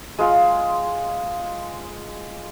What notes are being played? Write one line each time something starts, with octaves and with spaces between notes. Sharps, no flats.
G#3 F4